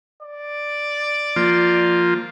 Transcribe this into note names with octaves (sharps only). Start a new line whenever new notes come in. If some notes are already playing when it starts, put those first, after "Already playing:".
D5
F3 A#3 F4